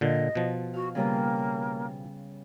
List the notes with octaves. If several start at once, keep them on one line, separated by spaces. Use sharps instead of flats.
A#2 D3 D#5
B2 F3
F#4 F5
C#3 G3 A#3 B3